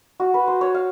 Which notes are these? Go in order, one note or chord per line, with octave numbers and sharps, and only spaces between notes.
F#4
B4
C5
C#5
F5